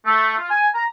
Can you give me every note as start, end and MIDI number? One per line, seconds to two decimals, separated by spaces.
0.06 0.35 57
0.38 0.50 65
0.51 0.68 80
0.75 0.85 82